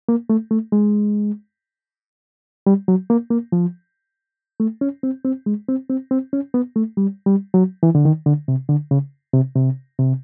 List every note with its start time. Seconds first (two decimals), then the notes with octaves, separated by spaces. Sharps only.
0.09 A#3
0.30 A3
0.51 A3
0.72 G#3
2.67 G3
2.88 F#3
3.10 A#3
3.31 A#3
3.52 F3
4.60 A3
4.81 C#4
5.03 C4
5.25 C4
5.46 G#3
5.68 C4
5.89 C4
6.11 C4
6.33 C#4
6.54 B3
6.76 A3
6.97 G3
7.26 G3
7.54 F#3
7.83 E3
7.95 D3
8.05 D#3
8.26 D3
8.48 C3
8.69 D3
8.91 C#3
9.34 C3
9.56 C3
9.99 C3